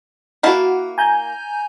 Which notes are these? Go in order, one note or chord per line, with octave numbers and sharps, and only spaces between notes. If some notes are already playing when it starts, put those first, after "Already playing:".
A#3 E4 F#4 F#5 A5
G#5 A#5 G6